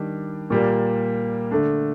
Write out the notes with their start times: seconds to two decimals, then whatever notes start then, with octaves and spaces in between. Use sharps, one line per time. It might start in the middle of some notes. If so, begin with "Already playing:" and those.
Already playing: D#3 G3 D4
0.50 A#2 G3 A#3
1.51 D3 A3 D4